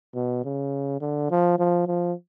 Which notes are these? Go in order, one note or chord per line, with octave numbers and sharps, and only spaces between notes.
B2
C#3
D3
F3
F3
F3